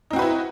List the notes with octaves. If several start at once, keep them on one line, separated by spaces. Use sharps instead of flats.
C4 D#4 E4 F#4 B4